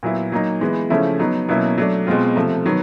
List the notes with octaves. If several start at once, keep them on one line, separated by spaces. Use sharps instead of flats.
A#2 F#3 B3 E4
F#3 A#3 D#4
E3 G#3 B3
C#3 F3 A3 C#4 E4
F#3 B3 D#4
B2 F#3 A#3 C#4 E4
F#3 A3 D4
B2 G#3 C4 F4
C3 F3 A3
D#3 F#3 B3